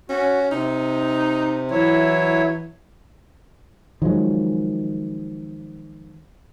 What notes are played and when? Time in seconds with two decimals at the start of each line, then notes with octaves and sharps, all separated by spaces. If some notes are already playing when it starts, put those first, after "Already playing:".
0.09 C#4 F#4
0.51 C3 D#4
1.71 E3 F#3 E4 C#5
4.02 D#3 F3 F#3 G#3